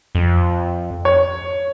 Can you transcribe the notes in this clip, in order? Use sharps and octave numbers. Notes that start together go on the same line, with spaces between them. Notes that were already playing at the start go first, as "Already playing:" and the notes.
F2
C#5